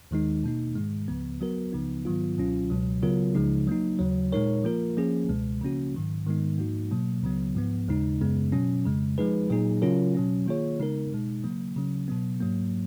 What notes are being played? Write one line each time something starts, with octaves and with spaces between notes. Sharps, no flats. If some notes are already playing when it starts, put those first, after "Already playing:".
D#2 D#3 G#3 D#4
B2 A#3 D#4
G#2 D#3 G#3
C#2 C#3 F3 B3
F#3 B3 F#4 A#4
C#2 C#3 F3 B3 D#4
G#2 D#3 F#3 B3 F4
C#2 B2 F#3 C#4 F4
C#2 B2 F#3
C#3 F#3 B3 F4 A#4
C#2 C#3 F3 G#3 D#4
F#3 A#3 D#4
D#2 C#3 F#3
A#2 G#3 D#4 A#4 C#5
F3 A#3 F4 A#4
F3 A#3 C#4 G#4
C#2 B2 G#3
C#3 F3 A#3 C#4 F#4
G#2 D#3 F#3
G#2 D#3 G#3 B3 D#4
G#2 F3 A#3 D#4 F#4
B2 F#3 A#3
C#2 C#3 F#3 B3
G#2 F3 B3
D#2 C#3 G#3 D#4
F#2 C#3 G#3 B3
B2 F#3 C#4
F2 C#3 G#3
F3 G#3 D#4 G#4 B4
A#2 F#3 A#3 D#4 G#4
C#3 F#3 C#4 F4 A#4
B2 F#3 C#4
D#3 A#3 F4 G#4 C#5
C#3 G#3 B3 D#4 A#4
B2 G#3 D#4
C#3 F#3 A#3
C#3 F#3 C#4
B2 F#3 B3
G#2 F#3 A#3